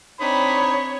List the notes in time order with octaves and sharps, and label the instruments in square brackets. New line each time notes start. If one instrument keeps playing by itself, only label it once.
[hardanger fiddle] C4 [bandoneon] D4 D#4 D#6 [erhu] C#5 [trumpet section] B5